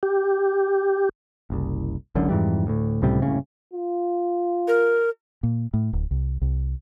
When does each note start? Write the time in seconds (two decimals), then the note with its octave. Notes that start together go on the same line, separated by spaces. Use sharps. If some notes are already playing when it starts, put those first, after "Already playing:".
0.03 G4
1.50 F#1 C2
2.15 F#1 C#2 F#2 D3
2.29 F2 G#2 E3 G3
2.67 D2 A2
3.02 C#2 A2 C3 G3
3.22 F#1 C2 A2 C#3
3.73 F4
4.68 A#4
5.43 A#2
5.74 A2
5.93 D1
6.11 C2
6.42 C2